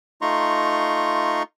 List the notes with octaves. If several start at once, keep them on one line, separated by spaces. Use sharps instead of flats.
A3 D#4 F4 A#5 C6 C#6